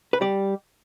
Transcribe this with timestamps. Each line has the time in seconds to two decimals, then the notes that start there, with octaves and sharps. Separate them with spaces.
0.13 B4
0.21 G3 D5